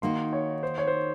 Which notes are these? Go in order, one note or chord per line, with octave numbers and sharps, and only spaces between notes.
D#3 A#3 D#4 F#4 C6
C#5
C5
C#5
C5